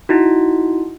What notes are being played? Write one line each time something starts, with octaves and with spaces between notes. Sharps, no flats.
D#4 E4 F#4